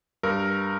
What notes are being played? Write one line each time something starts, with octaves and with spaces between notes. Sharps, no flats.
G2 A#4